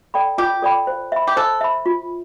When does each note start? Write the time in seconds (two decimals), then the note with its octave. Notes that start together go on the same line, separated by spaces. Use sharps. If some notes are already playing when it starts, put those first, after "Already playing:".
0.14 A4 D5 G5 B5
0.38 F4 G4
0.62 A4 D5 G5 B5
0.87 C5
1.12 E5 B5
1.27 G4
1.37 A4 C5
1.61 E5 B5
1.86 F4